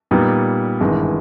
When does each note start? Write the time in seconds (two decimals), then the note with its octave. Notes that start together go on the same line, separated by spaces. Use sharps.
0.11 A#2 G3 B3 D#4
0.80 G#1 G2 E3 G#3